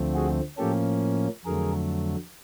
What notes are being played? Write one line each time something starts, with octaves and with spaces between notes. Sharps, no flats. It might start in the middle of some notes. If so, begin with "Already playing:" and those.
Already playing: D2 D3 F3 A3 C4
F#4 G#4
A2 F3 A#3 C#4 G4 A4
F2 D3 F#3 A3 G#4 A#4